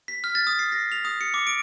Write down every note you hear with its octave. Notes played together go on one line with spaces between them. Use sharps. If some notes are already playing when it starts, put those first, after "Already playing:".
B6
F6
A6
D#6
C7
A#6
F7
D#6
C#7
D6
D7